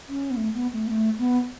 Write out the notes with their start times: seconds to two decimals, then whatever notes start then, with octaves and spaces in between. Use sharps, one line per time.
0.09 C#4
0.31 B3
0.37 A3
0.54 B3
0.73 A3
0.87 B3
0.91 A3
1.18 B3